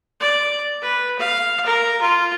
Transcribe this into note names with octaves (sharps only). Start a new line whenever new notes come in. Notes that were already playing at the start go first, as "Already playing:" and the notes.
D5
B4
F5
A#4
F4